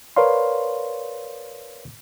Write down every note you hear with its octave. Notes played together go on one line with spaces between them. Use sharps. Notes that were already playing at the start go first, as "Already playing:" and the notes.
A#4 B4 C#5 D5 F5 C6